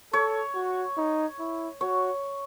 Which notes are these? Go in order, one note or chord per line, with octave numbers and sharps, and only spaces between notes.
A4 C#5
F#4
D#4
E4
F#4 C#5